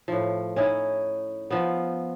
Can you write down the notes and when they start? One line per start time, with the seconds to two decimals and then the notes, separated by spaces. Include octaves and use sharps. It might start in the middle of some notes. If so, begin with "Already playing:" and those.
0.08 A2 F3
0.56 C#4 D#4 E4
1.50 F3 B3